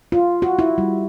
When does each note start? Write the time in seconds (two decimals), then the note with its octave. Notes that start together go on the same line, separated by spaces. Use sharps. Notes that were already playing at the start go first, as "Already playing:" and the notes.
0.12 F4
0.42 F#4
0.59 E4
0.78 G3